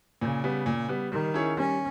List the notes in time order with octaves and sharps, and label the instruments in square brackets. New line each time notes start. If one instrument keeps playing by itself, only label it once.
[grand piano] A#2 [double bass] C#3
[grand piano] G3 B3
A#2
G3 B3
[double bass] D#3 [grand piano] G3
[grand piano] C#4 E4 G#4 C#5
[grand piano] G3 [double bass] C#4